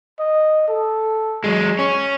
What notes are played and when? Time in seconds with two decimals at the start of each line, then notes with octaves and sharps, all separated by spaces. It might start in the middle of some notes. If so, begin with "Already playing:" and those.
0.19 D#5
0.68 A4
1.44 F#3 G#3
1.79 C#4 C#6